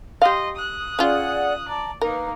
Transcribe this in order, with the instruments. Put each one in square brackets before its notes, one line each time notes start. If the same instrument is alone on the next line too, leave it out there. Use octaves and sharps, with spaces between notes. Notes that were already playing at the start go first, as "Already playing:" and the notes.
[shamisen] G4 F5 [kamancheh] D#5 C6
[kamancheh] D#6 F#6
[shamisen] C#4 F4 [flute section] G#4 D5 F#5
[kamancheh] D5 [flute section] A5 A#5
[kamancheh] A#3 D#4 [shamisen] A#4 [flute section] B4 A#5